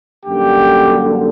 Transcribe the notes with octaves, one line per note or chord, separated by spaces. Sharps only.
F#2 D3 G3 A#3 G4